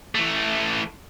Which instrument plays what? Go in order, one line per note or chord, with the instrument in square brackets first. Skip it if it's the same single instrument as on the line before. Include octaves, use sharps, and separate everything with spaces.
[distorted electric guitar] E3 A3